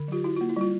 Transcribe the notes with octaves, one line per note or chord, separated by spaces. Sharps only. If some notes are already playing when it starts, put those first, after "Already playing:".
Already playing: D3
F#3 F4 G4
E4 F#4
F4
A#3
E4
G3 F4